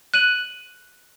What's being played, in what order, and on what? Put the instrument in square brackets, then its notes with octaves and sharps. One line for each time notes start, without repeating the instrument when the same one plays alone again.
[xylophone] F#6 D#7 F#7